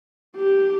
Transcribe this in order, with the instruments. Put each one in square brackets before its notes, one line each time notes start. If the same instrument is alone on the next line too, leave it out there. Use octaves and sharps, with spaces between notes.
[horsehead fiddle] G4